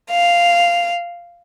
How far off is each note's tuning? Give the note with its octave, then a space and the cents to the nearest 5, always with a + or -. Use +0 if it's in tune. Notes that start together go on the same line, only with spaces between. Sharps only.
F5 -5